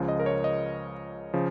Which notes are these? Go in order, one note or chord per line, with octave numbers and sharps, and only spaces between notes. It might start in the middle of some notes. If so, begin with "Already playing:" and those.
Already playing: C#2 C#3 F3
D#5
A#4
C#5
D#5
C#3 F3